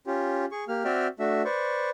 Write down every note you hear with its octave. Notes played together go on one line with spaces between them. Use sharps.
C#4 F4 G4
G#4 C#6
A#3 G4 F6
C4 F#4 D5 E5 G5 F6
A3 D4 F#4 E5
B4 C5 D5 C#6